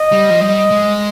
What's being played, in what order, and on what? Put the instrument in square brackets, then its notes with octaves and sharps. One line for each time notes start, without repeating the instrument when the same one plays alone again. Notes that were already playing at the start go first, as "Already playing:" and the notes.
Already playing: [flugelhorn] D#5
[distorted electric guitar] G3
F3
[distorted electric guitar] G3 [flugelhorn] D#5
[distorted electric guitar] G#3